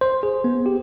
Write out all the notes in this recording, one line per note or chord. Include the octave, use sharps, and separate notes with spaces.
C5
G#4
B3
G4